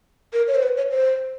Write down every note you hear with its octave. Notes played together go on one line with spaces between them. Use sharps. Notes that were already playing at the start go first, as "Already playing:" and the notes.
A#4
C#5
C5
B4
C#5
C5